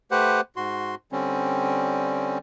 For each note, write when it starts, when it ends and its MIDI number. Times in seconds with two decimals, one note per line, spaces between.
0.11 0.41 57
0.11 0.41 67
0.11 0.41 71
0.11 0.41 72
0.11 0.41 78
0.56 0.95 44
0.56 0.95 66
0.56 0.95 84
1.12 2.38 50
1.12 2.38 55
1.12 2.38 60
1.12 2.38 61